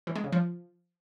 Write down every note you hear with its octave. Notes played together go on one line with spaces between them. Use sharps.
E3
G#3
C#3
F3